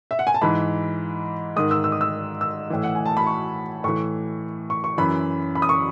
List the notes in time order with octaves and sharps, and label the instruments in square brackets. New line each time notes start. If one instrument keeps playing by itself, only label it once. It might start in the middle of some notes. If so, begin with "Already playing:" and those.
[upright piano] E5
F#5
G#5
A5
G#2 E3 B5
G#2 D#3 D#6
E6
E6
D#6
E6
E6
A2 E3
F#5
G#5
A5
B5
C#6
A2 E3 C#6
C#6
C#6
F#2 E3 B5
B5
D#6
C#6